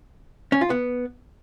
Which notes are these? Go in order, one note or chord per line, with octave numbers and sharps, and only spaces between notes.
C#4
F4
B3